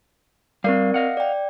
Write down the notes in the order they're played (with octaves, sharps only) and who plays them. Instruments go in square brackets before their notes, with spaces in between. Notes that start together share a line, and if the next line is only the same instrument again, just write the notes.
[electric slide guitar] G3 F5 [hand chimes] C4 A#4 D5
[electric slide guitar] D#5 F5 F#5
[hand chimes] D5 G5